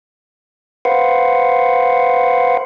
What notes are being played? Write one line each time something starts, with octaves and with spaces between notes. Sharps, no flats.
B4 C5 F5 F#5